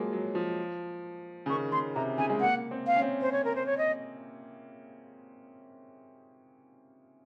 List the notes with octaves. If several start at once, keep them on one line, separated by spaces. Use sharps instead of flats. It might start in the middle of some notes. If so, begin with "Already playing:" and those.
Already playing: F3 F#3 G#3 A#3
F#3
F3
C#3
D#3 C#6
C#3 C6
C3 A#5
C#3 G#5
G#3
A#3 F#5
C4
F5
C#4
C4
C5
C#5
A#4
C5
C#5
D#5